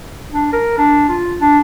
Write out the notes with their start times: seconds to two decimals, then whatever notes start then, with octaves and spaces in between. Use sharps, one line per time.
0.32 D4
0.53 A#4
0.78 D4
1.09 F4
1.40 D4